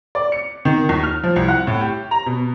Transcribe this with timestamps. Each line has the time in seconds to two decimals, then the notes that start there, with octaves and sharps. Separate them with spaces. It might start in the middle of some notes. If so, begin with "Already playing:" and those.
0.15 D5
0.32 C#7
0.65 D#3
0.89 D#2
1.03 F6
1.23 F3
1.36 C2
1.48 F#5
1.67 A2
1.81 G4
2.11 A#5
2.26 B2